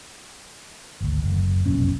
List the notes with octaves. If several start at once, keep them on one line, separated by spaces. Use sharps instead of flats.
G#1 D2
F#1
F1 B1 A#2 C#4